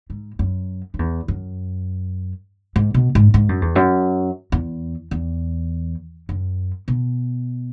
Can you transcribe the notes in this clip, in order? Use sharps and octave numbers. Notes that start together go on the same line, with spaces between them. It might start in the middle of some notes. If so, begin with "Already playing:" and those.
G#2
F#2
F#2
E2
F#2
G#2
B2
G#2
G#2
F#2
E2
F#2
E2
E2
F#2
B2